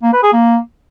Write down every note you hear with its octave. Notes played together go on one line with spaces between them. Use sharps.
A#3
B4
G#4
A#3